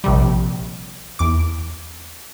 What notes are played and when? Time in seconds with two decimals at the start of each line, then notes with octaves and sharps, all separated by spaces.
0.04 A#1 C3 G3
1.19 E2 D6